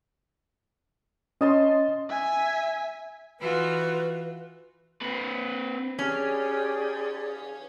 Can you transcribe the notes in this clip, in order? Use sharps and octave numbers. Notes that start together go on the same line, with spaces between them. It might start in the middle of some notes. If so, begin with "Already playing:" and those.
C#4 D#5 A5 C6
E5 G#5
E3 F4 F#4 B4
C4 B4
C#4 G4 G#4 D5